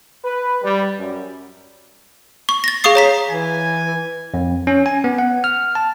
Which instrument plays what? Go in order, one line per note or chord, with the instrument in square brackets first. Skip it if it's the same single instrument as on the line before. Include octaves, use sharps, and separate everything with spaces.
[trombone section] B4
G3
F#2
[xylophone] C#6
A6 A#6
G#4 F5 C#6 D#6 C7
C#5 A#5 B6
[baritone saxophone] E3 [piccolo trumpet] G#5
[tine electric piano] F2
C#4
G#5
B3
F#5
F6
A5